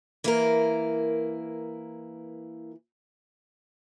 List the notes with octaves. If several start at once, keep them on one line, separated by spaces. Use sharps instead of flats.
E3 A#3 E4 A#4